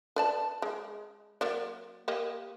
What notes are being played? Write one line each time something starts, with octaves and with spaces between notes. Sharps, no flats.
B4 D5 A5
G#3
F#3 A#3 D5
A#3 G4 D#5